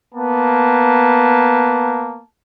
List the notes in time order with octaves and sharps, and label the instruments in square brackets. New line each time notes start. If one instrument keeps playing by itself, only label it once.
[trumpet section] A#3 B3 A5